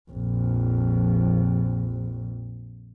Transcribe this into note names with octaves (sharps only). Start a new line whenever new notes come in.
A#1 F2